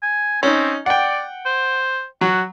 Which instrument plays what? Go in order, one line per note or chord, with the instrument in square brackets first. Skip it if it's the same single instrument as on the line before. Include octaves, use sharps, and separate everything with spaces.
[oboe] G#5
[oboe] C4 [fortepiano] C#4 D#4
[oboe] D5 [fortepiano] F#5 G5
[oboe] C5
[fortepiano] F#3 [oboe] F#4